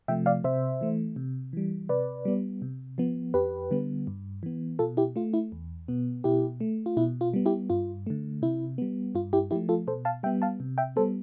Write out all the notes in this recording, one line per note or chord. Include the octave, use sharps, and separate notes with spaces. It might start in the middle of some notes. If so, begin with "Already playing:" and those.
C3 F3 A3 E5 G5
D5 F5
C3 C5 E5
E3 A3
C3
E3 G3
C3 B4 D5
G3 B3
C3
F3 B3
F2 G4 B4
D3 G3 B3
G2
E3 B3
B2 F4 A4
E4 G4
A3 F4
E4
E2
B2 B3
B2 E4 G4
A3
F4
B2 E4
F4
G3 B3
E4 G4
G2 F4
D3 A3
C3 E4
G3 B3
G2 F4
E4 G4
F3 A3 E4 G4
F4 A4
B2 A4 C5
F5 A5
G3 B3 E5 G5
F5 A5
C3
E5 G5
G3 B3 A4 C5